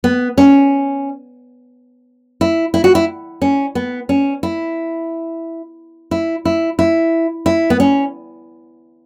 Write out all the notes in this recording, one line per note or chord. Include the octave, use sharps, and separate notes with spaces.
B3
C#4
E4
E4
F#4
E4
C#4
B3
C#4
E4
E4
E4
E4
E4
B3
C#4